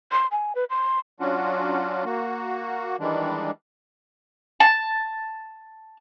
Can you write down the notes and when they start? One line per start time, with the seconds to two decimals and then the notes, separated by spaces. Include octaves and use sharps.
0.12 C6
0.32 G#5
0.55 B4
0.70 C6
1.20 F#3 C#4 D4 F4 F#4
2.05 A#3 F#4
3.00 D#3 E3 G3 G#3 D4
4.60 A5